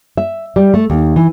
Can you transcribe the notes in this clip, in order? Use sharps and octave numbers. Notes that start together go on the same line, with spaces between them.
E5
G3
A3
D#2
E3